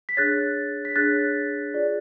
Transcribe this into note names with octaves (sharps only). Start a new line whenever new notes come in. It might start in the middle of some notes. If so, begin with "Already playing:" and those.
B6
D4 G#4 C#5 F#6 A6
B6
D4 G#4 C#5 F#6 A6
F4 G#4 D5